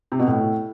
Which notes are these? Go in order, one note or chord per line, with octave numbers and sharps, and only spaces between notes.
C3
B2
A2